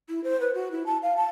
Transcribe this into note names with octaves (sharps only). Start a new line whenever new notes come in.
E4
C5
B4
F#4
E4
A5
F5
A5